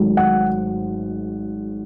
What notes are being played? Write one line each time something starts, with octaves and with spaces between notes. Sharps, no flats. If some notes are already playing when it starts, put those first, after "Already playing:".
Already playing: G#1 G#2 F#3 A3
F#5